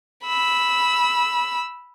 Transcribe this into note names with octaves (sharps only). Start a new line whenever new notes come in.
B5 E6